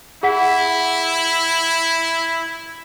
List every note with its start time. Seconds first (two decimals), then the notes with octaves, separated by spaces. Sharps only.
0.23 E4 G#4 F#5 B6